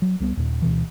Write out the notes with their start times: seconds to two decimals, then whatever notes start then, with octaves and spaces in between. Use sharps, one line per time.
0.02 F#3
0.20 C2 G3 B3
0.37 D#2 A#2
0.62 D2 B2 E3